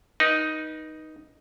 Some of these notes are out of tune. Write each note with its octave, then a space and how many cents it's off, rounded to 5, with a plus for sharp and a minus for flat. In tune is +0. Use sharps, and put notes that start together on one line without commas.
D#4 +0 B4 -35